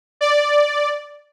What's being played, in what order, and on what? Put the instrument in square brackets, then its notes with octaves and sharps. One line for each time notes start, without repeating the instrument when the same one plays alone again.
[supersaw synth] D5